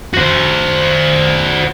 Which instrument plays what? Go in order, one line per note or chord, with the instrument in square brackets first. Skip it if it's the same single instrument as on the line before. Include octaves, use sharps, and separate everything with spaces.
[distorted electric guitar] F#4 C5